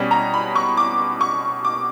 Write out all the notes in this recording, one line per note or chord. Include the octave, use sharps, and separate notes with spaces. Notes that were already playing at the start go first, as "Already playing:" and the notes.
Already playing: B2 G3 C#4
A#5
B5
C#6
D6
C#6
D6